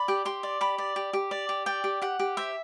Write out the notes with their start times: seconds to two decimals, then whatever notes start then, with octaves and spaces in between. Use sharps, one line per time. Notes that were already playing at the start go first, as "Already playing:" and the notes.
Already playing: D5 B5
0.08 G4
0.25 G4 C6
0.43 D5
0.61 G4 B5
0.78 D5
0.96 G4
1.13 G4
1.31 D5
1.49 G4
1.66 D5 G5
1.84 G4
2.02 G4 F#5
2.19 G4
2.37 C5 E5